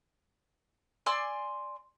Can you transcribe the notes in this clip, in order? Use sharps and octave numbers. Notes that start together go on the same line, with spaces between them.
D5 G#5 C6 E6